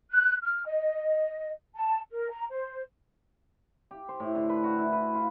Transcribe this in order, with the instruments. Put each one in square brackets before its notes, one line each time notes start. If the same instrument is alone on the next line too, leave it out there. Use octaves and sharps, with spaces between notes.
[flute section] F#6
F6
D#5
A5
A#4
A#5
C5
[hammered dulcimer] G4
C5
A2
D3
B4
F#4
E4
B4
F4